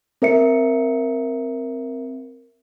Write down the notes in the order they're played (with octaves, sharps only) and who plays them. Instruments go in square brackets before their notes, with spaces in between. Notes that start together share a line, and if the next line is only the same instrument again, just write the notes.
[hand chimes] C4 A#4 E5 C#7